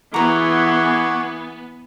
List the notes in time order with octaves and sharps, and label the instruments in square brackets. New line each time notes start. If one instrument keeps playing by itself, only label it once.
[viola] E3 G#4 [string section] B3 [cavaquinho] F#4 A#5 [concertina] F#5 C#6 D6